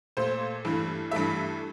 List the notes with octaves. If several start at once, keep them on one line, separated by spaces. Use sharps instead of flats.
A#2 A3 C5
G2 E3 A3
G2 E3 A3 E5